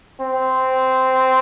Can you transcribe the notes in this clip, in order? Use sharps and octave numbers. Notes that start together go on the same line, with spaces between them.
C4